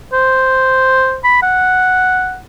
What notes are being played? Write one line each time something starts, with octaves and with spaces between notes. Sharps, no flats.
C5
B5
F#5